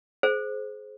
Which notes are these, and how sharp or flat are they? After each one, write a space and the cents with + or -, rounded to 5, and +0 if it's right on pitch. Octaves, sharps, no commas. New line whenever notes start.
G#4 +35 C5 +0